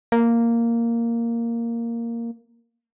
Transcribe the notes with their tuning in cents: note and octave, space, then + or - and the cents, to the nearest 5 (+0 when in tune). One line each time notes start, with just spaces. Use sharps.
A#3 -5